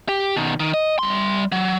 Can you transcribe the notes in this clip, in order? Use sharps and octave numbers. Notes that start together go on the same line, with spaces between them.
G4
B2 D#3
D#3
D#5
G3 C6
F#3